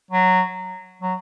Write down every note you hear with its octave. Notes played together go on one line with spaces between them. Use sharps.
F#3
F#3